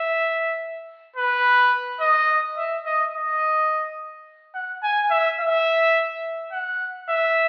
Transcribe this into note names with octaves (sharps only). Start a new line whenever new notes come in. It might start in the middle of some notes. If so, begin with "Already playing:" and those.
Already playing: E5
B4
D#5
E5
D#5
D#5
F#5
G#5
E5
E5
F#5
E5